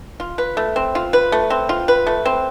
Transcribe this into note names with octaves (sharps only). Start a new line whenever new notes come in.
F4
B4
A3
C4
F4
B4
A3
C4
F4
B4
A3
C4